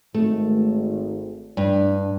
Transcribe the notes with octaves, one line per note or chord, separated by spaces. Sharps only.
G#1 A3
G2 D4